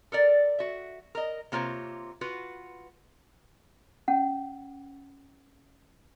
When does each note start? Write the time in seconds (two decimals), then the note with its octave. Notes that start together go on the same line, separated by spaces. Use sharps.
0.12 A4 A#4 D5
0.59 F#4 E5
1.15 A#4 D#5
1.52 C3 A#3 F4 C5 C#5
2.21 F4 F#4 B4
4.08 C#4 F#5